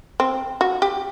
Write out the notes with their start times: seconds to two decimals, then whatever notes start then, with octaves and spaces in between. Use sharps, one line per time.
0.20 C4
0.61 F#4
0.82 G4